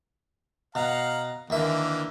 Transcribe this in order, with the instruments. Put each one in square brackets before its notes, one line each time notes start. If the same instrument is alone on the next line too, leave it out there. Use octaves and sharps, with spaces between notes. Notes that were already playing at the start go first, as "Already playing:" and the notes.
[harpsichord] B2 [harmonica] F5 F#5 A#5
[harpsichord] D#2 E5 [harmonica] D3 E3 A#3